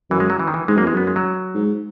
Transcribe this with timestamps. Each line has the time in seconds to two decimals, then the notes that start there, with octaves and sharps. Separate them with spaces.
0.11 F#2 E3
0.20 G#3
0.30 F#3
0.39 E3
0.48 D#3
0.54 E3
0.68 G#2 G#3
0.77 F#2 A#3
0.86 E2 G#3
0.94 F#2 B3
1.07 G#3
1.16 F#3
1.55 G#2